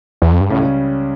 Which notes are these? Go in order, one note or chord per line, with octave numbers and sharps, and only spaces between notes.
E2
F2
G2
C#2 A2 C#3 G3 C#4